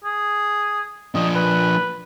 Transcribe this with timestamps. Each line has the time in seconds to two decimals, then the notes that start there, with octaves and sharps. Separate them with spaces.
0.04 G#4
1.15 F3 D4 D#5
1.35 B4